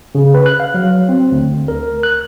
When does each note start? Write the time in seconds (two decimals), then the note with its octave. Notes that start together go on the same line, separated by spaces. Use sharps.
0.15 C#3
0.34 B4
0.46 F#6
0.60 F5
0.74 F#3
1.09 C4
1.32 D2
1.68 A#4
2.03 F#6